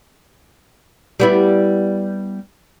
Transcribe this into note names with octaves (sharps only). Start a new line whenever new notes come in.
G3 B3 E4